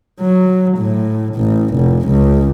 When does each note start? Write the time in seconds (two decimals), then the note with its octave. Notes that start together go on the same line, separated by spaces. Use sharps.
0.21 F#3
0.77 A2
1.36 A1
1.75 F1
2.08 C#2